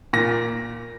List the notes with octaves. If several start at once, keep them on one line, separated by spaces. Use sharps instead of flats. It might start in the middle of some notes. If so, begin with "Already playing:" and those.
A#2 A#6